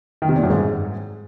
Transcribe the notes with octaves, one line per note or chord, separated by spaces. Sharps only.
D#3
C3
A#2
F#2
G#2